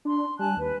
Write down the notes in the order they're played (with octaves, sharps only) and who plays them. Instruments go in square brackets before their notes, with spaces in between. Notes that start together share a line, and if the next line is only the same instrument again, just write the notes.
[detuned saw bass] D4 [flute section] C6
[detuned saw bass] G3 [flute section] G#5 A5 F#6
[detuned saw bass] D#2 [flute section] B4